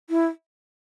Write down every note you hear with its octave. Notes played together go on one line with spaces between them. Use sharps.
E4